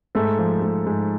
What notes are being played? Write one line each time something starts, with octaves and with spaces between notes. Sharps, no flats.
G#2 A3 A4
F3
A3
G#2